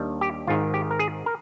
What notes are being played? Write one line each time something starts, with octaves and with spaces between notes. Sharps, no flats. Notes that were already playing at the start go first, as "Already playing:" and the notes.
Already playing: D#2 D#3 G3 D4
G4
G#1 G#2 D#3 F4
G4
A#4
G#4
A#4